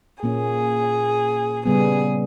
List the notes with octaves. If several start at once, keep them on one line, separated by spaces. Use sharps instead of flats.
A#2 A#3 C#4 G#4
C#3 G3 B3 G#4